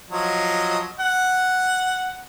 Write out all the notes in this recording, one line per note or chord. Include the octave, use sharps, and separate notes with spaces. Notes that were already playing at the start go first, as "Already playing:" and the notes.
F3 F#3 D#5
F#5